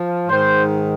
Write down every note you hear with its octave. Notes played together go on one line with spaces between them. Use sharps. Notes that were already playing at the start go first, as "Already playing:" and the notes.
Already playing: F3
G#2 D#3 C5